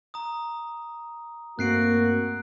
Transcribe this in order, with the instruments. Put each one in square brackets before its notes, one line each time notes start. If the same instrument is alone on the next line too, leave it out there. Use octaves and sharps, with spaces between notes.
[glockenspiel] A#5 D#6
[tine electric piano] G2 A3 C4 [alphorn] A#3 [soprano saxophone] F#4 [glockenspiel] F#6 C7 D7